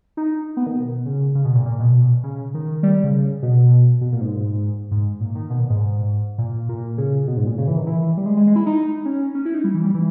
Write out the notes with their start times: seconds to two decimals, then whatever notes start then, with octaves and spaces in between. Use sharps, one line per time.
0.17 D#4
0.57 B3
0.67 D#3
0.76 B2
1.06 C#3
1.35 C#3
1.45 B2
1.55 A#2
1.65 A#2
1.80 B2
2.23 C#3
2.54 D#3
2.83 G3
3.04 C#3
3.42 B2
4.01 B2
4.12 A#2
4.21 G#2
4.91 G#2
5.20 A#2
5.35 D#3
5.50 B2
5.60 A#2
5.70 G#2
6.38 A#2
6.69 A#2
6.98 C#3
7.27 B2
7.37 G#2
7.47 A#2
7.58 C#3
7.68 E3
7.77 D#3
7.87 E3
8.02 E3
8.17 G3
8.26 G#3
8.37 G#3
8.47 G#3
8.56 E4
8.66 D#4
9.05 C#4
9.35 C#4
9.45 E4
9.54 D#4
9.64 G3
9.74 E3
9.84 G3
9.94 E3